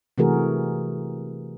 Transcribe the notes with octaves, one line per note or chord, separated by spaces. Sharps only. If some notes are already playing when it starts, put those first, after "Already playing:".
C3 E3 A3 F#4 G#4 A#4